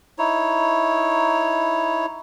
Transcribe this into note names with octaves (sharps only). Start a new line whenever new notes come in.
D#4 E4 C#5